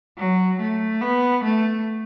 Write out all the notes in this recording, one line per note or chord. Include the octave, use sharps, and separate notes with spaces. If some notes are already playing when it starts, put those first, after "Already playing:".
F#3
A3
B3
A3